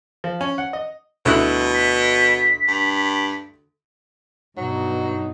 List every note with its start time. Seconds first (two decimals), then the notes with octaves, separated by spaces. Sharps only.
0.24 F3
0.41 C#4
0.58 F#5
0.73 D#5
1.25 D2 B2 E4 F#6
1.74 B6
2.68 G2
4.57 G2 B2 F#3 D#4